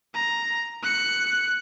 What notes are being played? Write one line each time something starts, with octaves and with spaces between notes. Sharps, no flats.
A#5
F#6 C#7